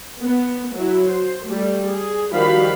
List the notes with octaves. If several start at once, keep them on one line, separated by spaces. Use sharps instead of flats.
B3
F#3 E4
C5
G3 A3
G#4
D#3 F3 G3 F#4 F5 B5